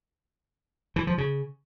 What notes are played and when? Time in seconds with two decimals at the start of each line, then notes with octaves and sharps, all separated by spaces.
0.96 E3
1.07 F3
1.18 C#3